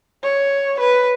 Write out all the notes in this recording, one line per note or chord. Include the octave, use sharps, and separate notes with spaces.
C#5
B4